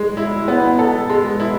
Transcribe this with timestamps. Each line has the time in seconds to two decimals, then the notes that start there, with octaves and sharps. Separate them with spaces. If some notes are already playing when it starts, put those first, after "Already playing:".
Already playing: G#3
0.17 E4
0.48 B3
0.79 A4
1.09 G#3
1.40 E4